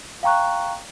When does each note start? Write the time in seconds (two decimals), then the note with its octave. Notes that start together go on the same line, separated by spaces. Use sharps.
0.23 F5 G5 A#5 C#6 F#6